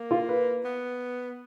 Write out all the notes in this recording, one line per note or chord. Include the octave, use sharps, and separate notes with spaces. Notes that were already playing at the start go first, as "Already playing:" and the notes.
Already playing: A#3
F4
B4
B3